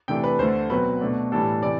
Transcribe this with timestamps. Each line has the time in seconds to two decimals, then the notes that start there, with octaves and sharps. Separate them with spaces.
0.08 C3 E3 A3 D4 G5
0.24 B4
0.39 D2 D3 A3 C5
0.70 B2 F#3 C4 B4
1.01 B2 A3 D4
1.32 A2 E3 G3 D4 A4
1.62 C3 E3 D5